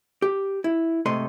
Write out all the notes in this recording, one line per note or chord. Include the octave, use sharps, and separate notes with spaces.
G4
E4
G#2 C3 A3 D#5 C6